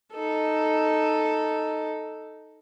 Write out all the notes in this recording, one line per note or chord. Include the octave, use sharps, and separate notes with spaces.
D#4 A4